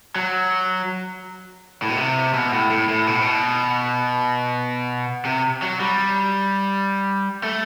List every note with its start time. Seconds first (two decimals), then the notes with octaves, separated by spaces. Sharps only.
0.16 F#3
1.82 A2
1.90 B2
1.97 C3
2.34 B2
2.53 A2
2.70 A2
2.89 A2
3.07 B2
3.15 A2
3.22 B2
5.25 C3
5.62 F#3
5.80 G3
7.44 A3